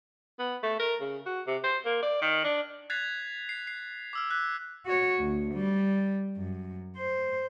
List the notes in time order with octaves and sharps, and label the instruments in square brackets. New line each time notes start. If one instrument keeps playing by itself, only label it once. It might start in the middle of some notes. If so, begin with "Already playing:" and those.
[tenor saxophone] B3
A3
A#4
C#3
F#4
C3
C5
A#3
D5
D#3
D4
[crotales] F#6 G#6 A6 B6 C7 F7
C7
C7
D6 E6 F6
F#6 B6
[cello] F#4 C#5
D2
G3
F#2
C5